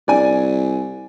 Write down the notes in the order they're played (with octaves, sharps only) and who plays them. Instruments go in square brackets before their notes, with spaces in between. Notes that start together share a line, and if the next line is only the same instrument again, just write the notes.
[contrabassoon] C2 [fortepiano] D5 G#5